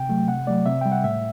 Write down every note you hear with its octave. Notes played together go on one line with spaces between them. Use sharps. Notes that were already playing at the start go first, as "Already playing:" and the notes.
Already playing: C3 G5
F#3 A3
C3 F#5
F#3 A3 D5
C3 E5
G3 G5
F#5
A2 E5